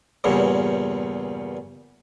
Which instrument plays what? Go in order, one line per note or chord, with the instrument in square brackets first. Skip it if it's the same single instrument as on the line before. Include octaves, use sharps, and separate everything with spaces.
[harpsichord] E2 G2 A#2 C#3